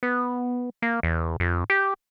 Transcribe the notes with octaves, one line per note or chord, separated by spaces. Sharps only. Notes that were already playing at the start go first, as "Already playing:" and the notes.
B3
A#3
E2
F2
G4